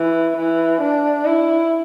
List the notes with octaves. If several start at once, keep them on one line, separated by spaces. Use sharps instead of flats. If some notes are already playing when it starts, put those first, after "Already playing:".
Already playing: E3
E3
D4
E4